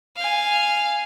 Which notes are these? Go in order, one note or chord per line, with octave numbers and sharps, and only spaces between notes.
F5 G#5